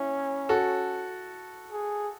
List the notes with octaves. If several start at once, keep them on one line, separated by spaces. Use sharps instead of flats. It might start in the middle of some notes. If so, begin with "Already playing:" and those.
Already playing: C#4 E4
F#4 A4
G#4